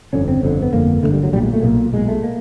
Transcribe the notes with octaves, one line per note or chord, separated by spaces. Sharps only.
G1 F2 D3 C#4
C4
G1 F2 D3
B3
G1 F2 D3 A#3
G1 F2 D3 A3
G3
F#3
B1 A#2 G3
G#3
A3
B1 A#2 A#3
B1 A#2 G#3
A3
A#3